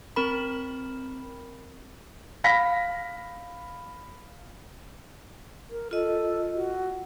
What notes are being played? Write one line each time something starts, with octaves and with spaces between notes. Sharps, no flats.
C4 A#4 B5
F5 B5 A#6 B6
A#4
F4 A4 D#5
F#4